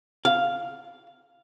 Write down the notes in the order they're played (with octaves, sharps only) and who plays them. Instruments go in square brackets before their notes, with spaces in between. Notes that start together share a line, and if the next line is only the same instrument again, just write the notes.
[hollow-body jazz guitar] F5